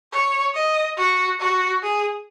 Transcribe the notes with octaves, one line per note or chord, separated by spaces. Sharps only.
C#5
D#5
F#4
F#4
G#4